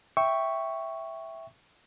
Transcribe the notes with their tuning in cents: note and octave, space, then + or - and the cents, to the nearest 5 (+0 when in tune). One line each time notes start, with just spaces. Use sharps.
E5 +0 G5 +0 C#6 +0